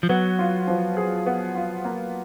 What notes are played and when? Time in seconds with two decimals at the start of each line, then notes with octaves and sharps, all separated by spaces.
0.03 F3
0.09 F#3 B3
0.39 F4
0.67 F3
0.97 G#4
1.26 B3
1.55 F4
1.85 A#3